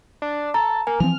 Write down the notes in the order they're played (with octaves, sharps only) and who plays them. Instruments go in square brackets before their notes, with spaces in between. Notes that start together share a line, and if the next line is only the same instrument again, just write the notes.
[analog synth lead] D4
[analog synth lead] A4 [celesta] A#5
[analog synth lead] A#3 [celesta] G#5
[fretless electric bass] E3 F3 C4 [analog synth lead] F6